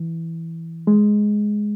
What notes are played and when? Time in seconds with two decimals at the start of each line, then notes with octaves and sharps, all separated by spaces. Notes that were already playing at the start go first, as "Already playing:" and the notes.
Already playing: E3
0.87 G#3